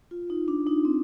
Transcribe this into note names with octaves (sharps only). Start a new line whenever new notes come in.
F4
D#4
D4
D#4
C4